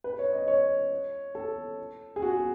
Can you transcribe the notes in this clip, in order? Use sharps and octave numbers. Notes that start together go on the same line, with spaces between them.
B4
C#5
D#5
C#5
A4
G#4
F#4